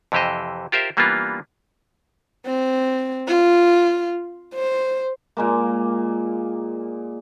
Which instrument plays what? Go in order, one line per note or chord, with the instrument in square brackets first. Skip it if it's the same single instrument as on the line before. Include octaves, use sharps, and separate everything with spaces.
[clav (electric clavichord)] F2 C3 E3 G4 C5 D#5
F4 G4 A#4 C5 E5
E3 G3 A#3 B3 D4 F4
[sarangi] C4
F4
C5
[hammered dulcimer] A#2 G#3 A#3